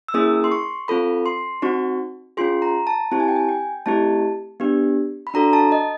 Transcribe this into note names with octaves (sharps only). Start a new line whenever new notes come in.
E6
A#3 C#4 E4 G#4 D#6
C6
C#6
C4 F4 A4 B5
C6
C4 D#4 F#4 C#6
C#4 F4 G#4 C6
A#5
A5
C4 E4 G4 A5
G#5
G5
G#5
G5
A3 C4 E4 G4 A5
B3 D4 G4
B5
D4 F#4 A4 A#5
A5
D#5